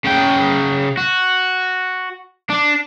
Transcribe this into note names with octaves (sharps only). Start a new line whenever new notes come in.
C#3 G5
F#4
D4